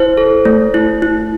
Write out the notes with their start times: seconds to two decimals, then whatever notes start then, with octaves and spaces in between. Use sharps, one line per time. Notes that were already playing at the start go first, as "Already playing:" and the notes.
Already playing: E4 C5
0.17 A4
0.45 A3
0.74 E4
1.02 E4